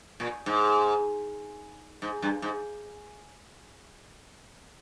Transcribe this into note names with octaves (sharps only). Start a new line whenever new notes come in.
A#2
G#2
G#2
G2
G#2